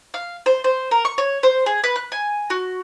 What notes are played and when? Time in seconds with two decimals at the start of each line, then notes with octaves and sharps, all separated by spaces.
0.14 F5
0.46 C5
0.64 C5
0.91 A#4
1.05 C#6
1.18 C#5
1.43 C5
1.66 G#4
1.84 B4
1.96 F#6
2.12 G#5
2.50 F#4